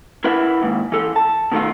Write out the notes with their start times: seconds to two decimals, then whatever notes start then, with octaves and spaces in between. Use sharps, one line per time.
0.24 E4 A#4 B4 E5 F#5
0.62 D#2 G#2
0.92 E3 A4
1.16 A5
1.52 B2 D#3 A3 F4